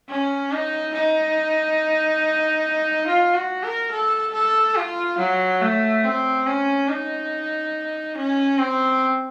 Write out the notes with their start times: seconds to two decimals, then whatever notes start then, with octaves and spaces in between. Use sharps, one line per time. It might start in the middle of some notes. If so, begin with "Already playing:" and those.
0.09 C#4
0.52 D#4
0.94 D#4
3.07 F4
3.35 F#4
3.63 A#4
3.91 A4
4.34 A4
4.76 F4
5.19 F#3
5.62 A3
6.04 C4
6.46 C#4
6.89 D#4
8.15 C#4
8.58 C4